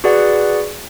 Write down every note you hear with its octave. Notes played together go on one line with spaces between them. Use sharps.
F#4 G#4 B4 D5 F#5